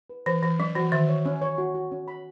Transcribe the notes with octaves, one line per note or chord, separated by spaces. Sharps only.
B4
E3 B4
E3 B4
F#3 C#4
E3 F#4
D#3 E5
C#5
C#4
C#5
F#4
F#4
C#4
B5